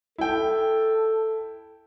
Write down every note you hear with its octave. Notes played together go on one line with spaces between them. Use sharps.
E4 A4 G5